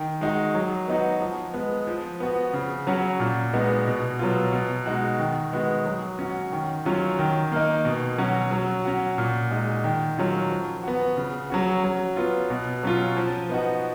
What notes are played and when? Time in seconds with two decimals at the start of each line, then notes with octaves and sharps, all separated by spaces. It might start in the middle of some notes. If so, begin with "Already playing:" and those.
Already playing: D#3
0.21 G#3 D#4 F#4
0.54 F#3
0.88 B3 D#4 F#4
1.21 F3
1.54 G#3 B3
1.87 F3
2.20 B3 F#4
2.53 C#3
2.87 F#3 C#4 F#4
3.20 A#2
3.53 G#3 B3 D#4 F#4
3.87 B2
4.19 F#3 B3 F4
4.53 B2
4.86 G#3 D#4 F#4
5.19 D#3
5.53 G#3 B3 F#4
5.86 F#3
6.19 C#4 F#4
6.52 D#3
6.85 F#3 C#4 F4
7.19 D#3
7.52 A#3 D#4
7.85 B2
8.18 F#3 C#4 F#4
8.51 F#3
8.85 C#4 F#4
9.18 A#2
9.51 G#3 D#4 F#4
9.84 D#3
10.18 F#3 C#4 F4
10.50 F3
10.83 B3 F#4
11.17 C#3
11.50 F#3 C#4 F#4
11.84 F#3
12.17 B3 F4
12.50 B2
12.83 F#3 C#4 F4
13.16 F3
13.49 B3 D#4 F#4